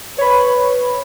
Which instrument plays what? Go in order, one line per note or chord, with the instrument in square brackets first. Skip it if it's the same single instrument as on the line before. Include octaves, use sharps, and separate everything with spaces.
[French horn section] B4 [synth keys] C#5 B5